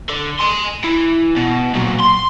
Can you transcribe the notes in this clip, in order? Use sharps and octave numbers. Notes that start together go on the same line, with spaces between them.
D3
G#5 C6
E3
B2
A#2 F#3
C6